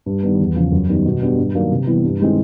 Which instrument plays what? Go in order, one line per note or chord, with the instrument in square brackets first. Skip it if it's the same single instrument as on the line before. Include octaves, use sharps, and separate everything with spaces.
[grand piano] G2
D#3 G3 B3
E2
C#3 F3
F#2
D#3 G3 B3
B2
G3 B3 D4 G4
G2
D#3 F#3 A#3 D4
C3
E3 G3 B3 E4
G2
D#3 G#3 C4 E4